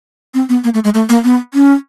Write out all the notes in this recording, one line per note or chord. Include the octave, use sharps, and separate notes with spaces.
C4
B3
A#3
A3
G#3
A3
A#3
B3
C#4